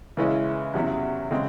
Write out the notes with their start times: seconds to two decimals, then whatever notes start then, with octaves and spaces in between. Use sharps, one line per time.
0.17 C#3 E3 G#3 C#4 E4
0.74 E2 C3 F#3 C#4 E4
1.31 C#3 G#3 C4